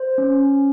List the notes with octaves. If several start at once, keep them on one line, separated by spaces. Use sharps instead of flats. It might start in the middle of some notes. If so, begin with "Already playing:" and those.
Already playing: C5
C#4